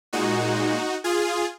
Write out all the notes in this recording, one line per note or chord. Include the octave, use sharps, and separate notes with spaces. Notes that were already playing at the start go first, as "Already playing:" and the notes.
A#2 G#3 D#4 F#4
F4 G#4